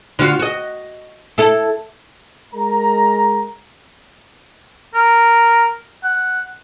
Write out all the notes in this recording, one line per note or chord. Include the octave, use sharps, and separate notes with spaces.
D3 F4 F#4
F#4 D#5
E4 A4
G#3 A#4 A#5
A#4
F#5